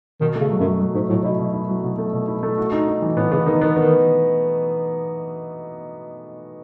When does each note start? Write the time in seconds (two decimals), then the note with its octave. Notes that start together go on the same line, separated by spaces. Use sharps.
0.21 B2 D#3
0.35 A3
0.40 C#3
0.50 F#3
0.60 F#2
0.65 F#3
0.80 F#3
0.95 G#2 A3
1.09 A2 F#3
1.24 B2 E4
1.39 B2
1.54 E4
1.69 F#3
1.84 B2
1.98 A3
2.13 B2
2.28 E4
2.43 A3
2.58 F#4
2.72 D#4
2.88 D#4
3.02 E3
3.17 A2 B3
3.32 C#3 B3
3.46 D#3 D#4
3.61 D#3 B3
3.76 D#3 B3